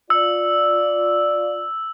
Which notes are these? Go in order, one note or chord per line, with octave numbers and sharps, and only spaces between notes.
F4 D5 E6